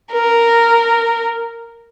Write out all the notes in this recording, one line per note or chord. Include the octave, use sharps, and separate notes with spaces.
A#4